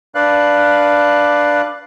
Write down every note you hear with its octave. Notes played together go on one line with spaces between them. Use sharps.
D4 B4 D5 F5 F#6